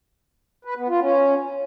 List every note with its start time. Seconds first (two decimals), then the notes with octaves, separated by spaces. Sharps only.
0.65 B4
0.77 B3
0.89 F4
1.00 C#4